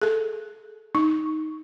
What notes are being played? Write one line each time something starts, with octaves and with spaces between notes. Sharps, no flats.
G#4 A4
D#4